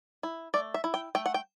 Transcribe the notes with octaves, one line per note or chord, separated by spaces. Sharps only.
E4
A3 D5
E5
E4
G5
A3 G5
F#5
G5